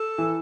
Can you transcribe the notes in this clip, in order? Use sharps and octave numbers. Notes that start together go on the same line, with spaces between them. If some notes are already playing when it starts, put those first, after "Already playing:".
Already playing: A4
E3